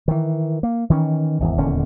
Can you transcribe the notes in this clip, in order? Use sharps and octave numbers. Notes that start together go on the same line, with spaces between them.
D#3 E3
A#3
D#3 E3 C#4
G#1 E2
D#1 E2 D3 C#4